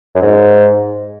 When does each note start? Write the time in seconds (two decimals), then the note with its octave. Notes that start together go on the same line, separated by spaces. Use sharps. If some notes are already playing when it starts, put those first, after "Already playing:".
0.15 F#2
0.22 G#2